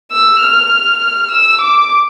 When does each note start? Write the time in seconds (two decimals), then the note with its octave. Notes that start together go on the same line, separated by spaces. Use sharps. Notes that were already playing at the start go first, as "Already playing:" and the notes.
0.11 E6
0.41 F6
1.31 E6
1.61 D6